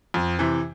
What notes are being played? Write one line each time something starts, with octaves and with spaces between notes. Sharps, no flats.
F2
C3 E3